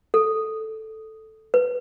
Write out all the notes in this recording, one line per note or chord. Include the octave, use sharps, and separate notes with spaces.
A4
B4